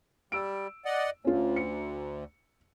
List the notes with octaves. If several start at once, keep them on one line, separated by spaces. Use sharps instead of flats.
G3 E6 D7
D5 D#5 F#5
D2 C#4 F4
C#7